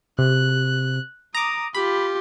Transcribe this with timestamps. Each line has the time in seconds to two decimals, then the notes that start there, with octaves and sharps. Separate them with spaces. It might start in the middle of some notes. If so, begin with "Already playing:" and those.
0.19 C3 F#6
1.34 A#5 D6 D#6
1.74 F4 G4 B5